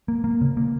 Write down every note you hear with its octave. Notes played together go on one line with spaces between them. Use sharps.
A#3
A#3
C#3
A#3